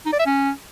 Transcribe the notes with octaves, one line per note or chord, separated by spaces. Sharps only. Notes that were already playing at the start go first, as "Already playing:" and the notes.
D#4
D5
E5
C#4